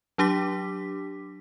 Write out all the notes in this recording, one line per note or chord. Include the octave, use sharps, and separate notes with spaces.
F#3 D4 G4 D6 B6